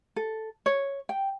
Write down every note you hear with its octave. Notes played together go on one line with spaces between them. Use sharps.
A4
C#5
G5